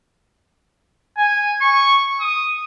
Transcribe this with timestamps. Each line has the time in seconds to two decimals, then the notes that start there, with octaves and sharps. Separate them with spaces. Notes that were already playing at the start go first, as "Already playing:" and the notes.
1.18 G#5
1.61 C#6
2.20 D#6